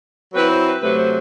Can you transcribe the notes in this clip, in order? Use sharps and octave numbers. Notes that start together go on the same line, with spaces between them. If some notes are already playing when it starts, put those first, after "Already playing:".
F#3 C4 E4 B4
C5
B4
C3 F#3 A3 B4
C5